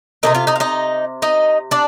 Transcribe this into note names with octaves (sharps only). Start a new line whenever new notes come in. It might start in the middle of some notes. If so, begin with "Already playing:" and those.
C3 G3 A#3 D#4 D#5
F4 F5
D#4 D#5
F5
D#4 D#5
D#4 D#5
D4 D5